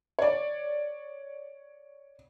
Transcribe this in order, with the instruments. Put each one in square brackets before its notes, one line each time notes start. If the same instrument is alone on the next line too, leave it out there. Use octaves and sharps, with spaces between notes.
[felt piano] C#5 D5